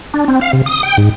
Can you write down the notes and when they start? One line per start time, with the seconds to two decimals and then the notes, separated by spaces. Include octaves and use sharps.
0.14 D4
0.28 C4
0.41 F5
0.53 C3
0.66 D#6
0.83 G5
0.98 G#2